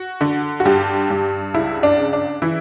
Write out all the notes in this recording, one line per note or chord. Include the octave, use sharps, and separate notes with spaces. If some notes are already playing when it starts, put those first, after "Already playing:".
Already playing: F#4
D3
F#4
G2 G4
G2
C#2 E4
D4
C#3
D4
E3 E4